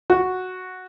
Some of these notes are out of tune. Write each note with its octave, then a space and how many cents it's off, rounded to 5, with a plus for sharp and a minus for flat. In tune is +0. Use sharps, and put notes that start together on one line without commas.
F#4 -5